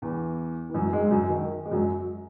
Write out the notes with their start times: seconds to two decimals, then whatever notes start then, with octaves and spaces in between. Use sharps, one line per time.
0.02 E2 E3
0.70 E3
0.74 F#2 F#3
0.93 G#2 G#3
1.11 F#2 F#3
1.29 D#3
1.65 G#3
1.71 F#2 F#3